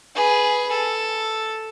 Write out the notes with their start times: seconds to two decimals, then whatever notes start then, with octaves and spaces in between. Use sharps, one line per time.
0.15 G#4 B4
0.72 A4